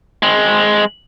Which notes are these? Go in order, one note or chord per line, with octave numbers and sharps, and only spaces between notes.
G#3 C4